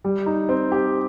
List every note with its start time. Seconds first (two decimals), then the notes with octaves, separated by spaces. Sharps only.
0.04 G3
0.26 D#4
0.49 C4
0.72 G4